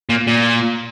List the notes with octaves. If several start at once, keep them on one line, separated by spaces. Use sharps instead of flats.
A#2
A#2